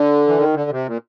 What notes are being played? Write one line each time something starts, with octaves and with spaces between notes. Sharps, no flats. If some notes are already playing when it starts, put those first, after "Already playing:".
Already playing: D3
E3
D#3
D3
C3
A#2